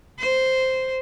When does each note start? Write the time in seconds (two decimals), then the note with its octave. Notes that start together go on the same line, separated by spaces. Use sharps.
0.19 C5